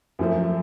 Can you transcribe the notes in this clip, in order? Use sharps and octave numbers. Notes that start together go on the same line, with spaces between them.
F#2 F3 A3